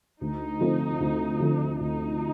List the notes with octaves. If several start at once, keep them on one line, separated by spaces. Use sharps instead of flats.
D2 D#4
D3 F3 A3 C4
D2
D3 F3 A3 C4
D2 D#4